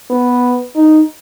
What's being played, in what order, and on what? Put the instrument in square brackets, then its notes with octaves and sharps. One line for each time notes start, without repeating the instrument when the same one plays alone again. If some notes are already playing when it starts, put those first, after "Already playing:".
[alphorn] B3
D#4